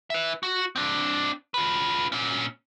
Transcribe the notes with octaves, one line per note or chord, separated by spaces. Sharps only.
B4 E5
F#4
C4 D4
F4 B4
A#2 C#4